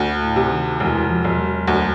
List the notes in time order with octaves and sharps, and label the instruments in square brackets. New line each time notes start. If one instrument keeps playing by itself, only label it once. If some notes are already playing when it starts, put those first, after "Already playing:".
Already playing: [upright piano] D2
[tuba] A2
[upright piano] C3
[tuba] D#3
[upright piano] E1 [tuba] E3
[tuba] F3
[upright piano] E1
[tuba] F#3
[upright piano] D2